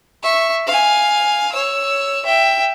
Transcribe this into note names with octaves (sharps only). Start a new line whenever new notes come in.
E5 C#6
F5 G#5
C#5 E6
E5 G5